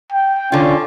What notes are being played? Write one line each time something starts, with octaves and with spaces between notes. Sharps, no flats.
G5
D3 C#4 F4